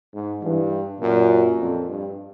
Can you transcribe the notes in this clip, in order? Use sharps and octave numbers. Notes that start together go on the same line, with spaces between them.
G#2
G2 E3
F#2 A#2
F2
G2